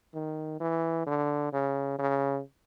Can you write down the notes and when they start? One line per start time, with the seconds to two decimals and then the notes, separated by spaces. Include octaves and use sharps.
0.14 D#3
0.60 E3
1.06 D3
1.53 C#3
1.98 C#3